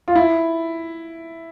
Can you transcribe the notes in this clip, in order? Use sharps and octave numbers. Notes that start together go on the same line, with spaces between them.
F4
E4